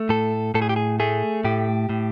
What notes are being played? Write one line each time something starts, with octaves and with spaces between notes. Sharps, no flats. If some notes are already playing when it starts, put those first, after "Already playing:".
Already playing: A3
A2 A4
A2 A4
G#4
G4
G#4
A3 G#4
A2 G4
A2